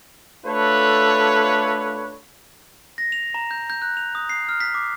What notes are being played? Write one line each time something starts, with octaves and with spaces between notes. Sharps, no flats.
A3 D4 F4 A4 B4 C#5
A#6
F7
A#5
G6
G6
F#6
F7
D#6
C7
F6
B6
D6